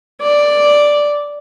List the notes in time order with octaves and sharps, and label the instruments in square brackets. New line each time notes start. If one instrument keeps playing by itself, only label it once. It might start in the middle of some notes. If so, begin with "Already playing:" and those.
[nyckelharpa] D5